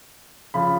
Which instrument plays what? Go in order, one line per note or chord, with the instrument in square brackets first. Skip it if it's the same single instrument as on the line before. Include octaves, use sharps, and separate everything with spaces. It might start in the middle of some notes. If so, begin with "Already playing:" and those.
[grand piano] C#3 F3 B5